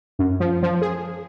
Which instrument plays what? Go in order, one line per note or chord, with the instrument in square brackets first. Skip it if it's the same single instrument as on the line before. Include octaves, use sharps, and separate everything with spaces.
[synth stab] F#2
F3
F3
G#4